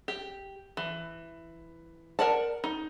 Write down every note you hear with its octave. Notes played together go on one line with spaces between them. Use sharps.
G4
E3
A#4 D5 F#5 A5
D#4